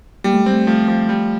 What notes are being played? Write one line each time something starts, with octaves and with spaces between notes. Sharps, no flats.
G3 A#3
A3
G#3 C4
A3
F3 A3
F3
G3